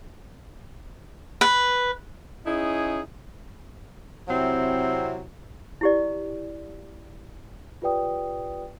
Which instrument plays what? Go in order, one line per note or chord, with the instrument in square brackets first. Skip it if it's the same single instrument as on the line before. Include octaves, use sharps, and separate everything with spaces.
[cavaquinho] B4
[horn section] C#4 D#4 E4 G#4
[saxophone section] C3 F#3 C4 E4
[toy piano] E4 G4 D5
[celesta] F4 G4 B4 D5 G5 D#6